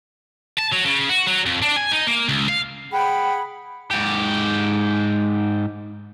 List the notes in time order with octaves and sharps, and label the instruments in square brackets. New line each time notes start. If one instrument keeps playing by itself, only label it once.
[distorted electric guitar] A5
F#3
C#3
F#4
F#3
F2
D4
G#5
D#4
A#3
C#2
F5
[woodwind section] G#4 F#5 B5 [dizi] G5
[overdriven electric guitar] G#2 G4